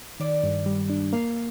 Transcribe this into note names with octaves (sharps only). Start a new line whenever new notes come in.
D#3 D5
G2
G3
D4
A#3 F5